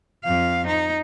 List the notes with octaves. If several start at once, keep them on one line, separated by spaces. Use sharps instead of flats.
F2 F5
D#4